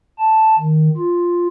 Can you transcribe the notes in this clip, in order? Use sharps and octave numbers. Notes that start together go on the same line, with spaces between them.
A5
D#3
F4